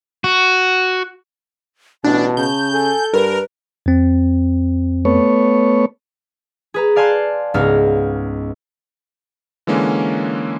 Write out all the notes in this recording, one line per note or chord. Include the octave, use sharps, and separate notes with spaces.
F#4
A1 B2 D4 A5
C#3 G6
A4 G#5
G2 A#4 B4
F2 C4
A3 B3 C#5
G#4 B4 A#5
D5 F5 G#5 A5 C6 F#6
C#2 G#2 B3 F5 F6 A#6
D3 E3 G#3 A#3 C#4